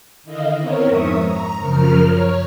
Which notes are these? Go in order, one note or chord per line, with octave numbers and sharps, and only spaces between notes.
D3 D#3 E4 D#5 F5
B3 C4 A#4 C#5
F2 G#2 E5 C#6 D#6
A#5
F#2 C#3 F3 A#4 F6
C#5